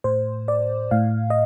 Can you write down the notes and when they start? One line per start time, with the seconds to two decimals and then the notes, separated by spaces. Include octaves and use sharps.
0.04 A2 C5
0.48 D5
0.91 A2 F5
1.30 D#5